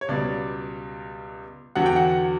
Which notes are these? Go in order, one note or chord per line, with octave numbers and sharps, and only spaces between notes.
C#5
C#2 B2 G3 D5
E2 D3 F#3 F#5
G5
F#5